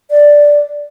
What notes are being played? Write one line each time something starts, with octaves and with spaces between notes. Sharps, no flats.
D5